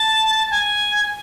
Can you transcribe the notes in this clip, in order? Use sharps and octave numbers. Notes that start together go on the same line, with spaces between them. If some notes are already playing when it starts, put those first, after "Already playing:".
Already playing: A5
G#5